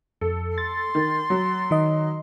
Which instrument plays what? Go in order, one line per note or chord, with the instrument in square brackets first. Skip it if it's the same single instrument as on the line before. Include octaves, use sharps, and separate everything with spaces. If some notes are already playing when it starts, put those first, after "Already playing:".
[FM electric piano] F2 [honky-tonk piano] A4
[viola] C6 [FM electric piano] A6
[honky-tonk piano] D#3
F#3
[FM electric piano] D#3 D#5